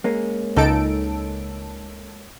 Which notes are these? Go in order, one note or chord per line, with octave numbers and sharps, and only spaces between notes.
G#3 A#3 C#4
C#2 D#4 A4 D7